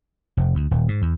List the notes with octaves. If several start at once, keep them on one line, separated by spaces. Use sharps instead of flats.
F1
D2
D#1
G#2
E2